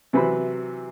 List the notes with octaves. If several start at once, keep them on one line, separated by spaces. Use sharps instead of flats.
C3 E3 F#3 B4 C5 B5